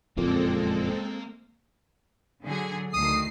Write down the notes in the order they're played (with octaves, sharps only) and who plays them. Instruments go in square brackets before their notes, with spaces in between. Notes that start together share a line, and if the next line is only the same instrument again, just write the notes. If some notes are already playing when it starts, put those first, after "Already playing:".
[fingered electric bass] F#1 F2 A#2 [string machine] G#3 C4 A4 [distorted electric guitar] A#3
[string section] D3 F#3 G#4
[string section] D2 D#3 C7 [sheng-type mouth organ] D#6